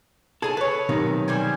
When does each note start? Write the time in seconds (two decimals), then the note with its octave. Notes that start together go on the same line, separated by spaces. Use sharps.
0.42 G#4 A4 G#5 A5
0.57 B4 C#5
0.89 B1 C3 D#3
1.28 G3 C5 G#5